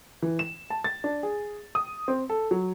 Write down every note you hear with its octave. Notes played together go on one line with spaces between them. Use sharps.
E3
E7
A5
A6
D4
G#4
D#6
C4
A4
F#3